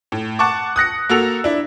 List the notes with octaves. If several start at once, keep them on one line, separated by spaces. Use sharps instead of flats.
A2
F#5 A5 C#6 D6
D#6 F#6 A#6 C#7
A#3 F#4 A4 E6 F7
D4 E4